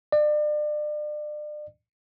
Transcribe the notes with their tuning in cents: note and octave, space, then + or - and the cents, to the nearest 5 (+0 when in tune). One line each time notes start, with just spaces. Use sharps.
D5 +35